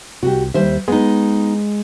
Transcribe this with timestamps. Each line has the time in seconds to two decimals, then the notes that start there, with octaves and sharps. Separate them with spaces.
0.23 C2 F#4 G4
0.54 D#2 G3 C5 E5
0.88 G#3 B3 D#4